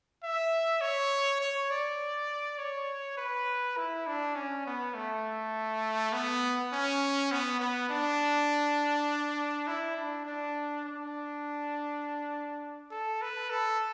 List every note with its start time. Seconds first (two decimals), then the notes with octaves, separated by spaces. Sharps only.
0.23 E5
0.81 C#5
1.41 C#5
1.70 D5
2.58 C#5
3.17 B4
3.77 E4
4.07 D4
4.35 C#4
4.66 B3
4.94 A3
6.13 B3
6.72 C#4
7.32 B3
7.60 B3
7.89 D4
9.67 E4
9.96 D4
10.26 D4
10.85 D4
12.91 A4
13.22 B4
13.50 A4